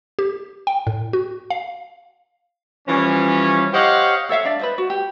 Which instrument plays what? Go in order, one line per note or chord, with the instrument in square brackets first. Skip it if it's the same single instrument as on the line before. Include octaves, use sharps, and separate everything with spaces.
[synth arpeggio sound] G4
G5
A2
F#4
F5
[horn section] E3 F3 G3 C#4
G4 C5 C#5 D#5 F5 F#5
[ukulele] A4 C#5 E5 F5
D4 D5
B4 C5 D#5
F#4
G4